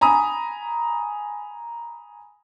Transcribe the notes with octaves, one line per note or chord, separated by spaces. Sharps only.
G#5 A#5 B5 D#6